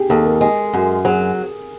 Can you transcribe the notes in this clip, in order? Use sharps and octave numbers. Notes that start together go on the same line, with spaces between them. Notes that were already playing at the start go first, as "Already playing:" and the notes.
Already playing: G4 G#4
D#2 A4
A#4
G#3
F#2
F#3 G#4